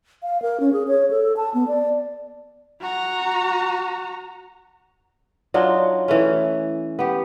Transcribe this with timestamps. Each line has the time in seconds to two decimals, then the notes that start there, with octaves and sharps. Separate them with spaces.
0.23 F5
0.42 A#4
0.60 C#4
0.73 G#4
0.87 C#5
1.10 A4
1.37 A5
1.54 B3
1.68 D5
2.81 F#4 A#5
5.54 F#3 D4 D#4 F4
6.08 E3 A3 C#4
6.99 B3 G4